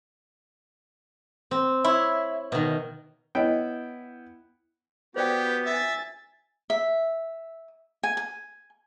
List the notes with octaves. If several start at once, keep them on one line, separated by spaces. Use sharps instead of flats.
C4
E4 C#5
B2 D#3
B3 E4 C#5 D#5 G5
B3 F#4 G4 B4 C5 D5 G5
E5 G#5 A6
E5
G#5
G#5